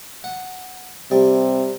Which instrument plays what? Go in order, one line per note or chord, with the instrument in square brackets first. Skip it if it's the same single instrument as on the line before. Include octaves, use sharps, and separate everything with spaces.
[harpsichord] F#5
[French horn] C3 [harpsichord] G3